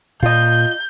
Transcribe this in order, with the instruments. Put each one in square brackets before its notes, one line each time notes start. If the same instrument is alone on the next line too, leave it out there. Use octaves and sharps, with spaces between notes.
[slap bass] A#2 [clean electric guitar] F4 D#5 [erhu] G6